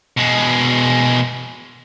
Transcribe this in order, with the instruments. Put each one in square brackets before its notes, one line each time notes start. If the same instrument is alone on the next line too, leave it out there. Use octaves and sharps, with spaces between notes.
[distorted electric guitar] B2 G#3